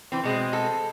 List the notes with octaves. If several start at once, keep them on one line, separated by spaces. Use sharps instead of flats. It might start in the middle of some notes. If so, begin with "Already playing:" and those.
E3 C4
B2 G#3 C4
A4